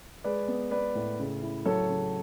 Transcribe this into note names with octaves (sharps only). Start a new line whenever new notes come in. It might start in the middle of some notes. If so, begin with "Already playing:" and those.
G#3 B4 D5
B3
B3 B4 D5
A2
C#3
E4
F#3 A4 C#5
C#3